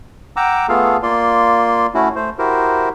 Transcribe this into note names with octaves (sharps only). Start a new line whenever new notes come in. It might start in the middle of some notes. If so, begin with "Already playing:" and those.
F#5 G5 A#5 D6 E6
A3 B3 F4 G#4 A4 F5
A#3 F4 D5 C6
A3 C#4 E4 F#4
A3 C5
E4 F#4 G4 A#4 C5